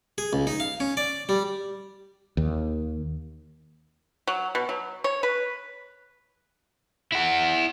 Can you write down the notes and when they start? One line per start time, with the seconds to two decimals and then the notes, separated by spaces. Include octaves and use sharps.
0.18 G#4
0.33 C#2
0.47 D#4
0.60 F5
0.80 C#4
0.97 D5
1.29 G3
2.37 D#2
4.27 F#3
4.55 B2
4.69 F#3
5.04 C#5
5.23 B4
7.12 E4 F#5